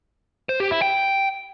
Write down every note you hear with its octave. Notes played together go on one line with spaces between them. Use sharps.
C5
G4
E4
G5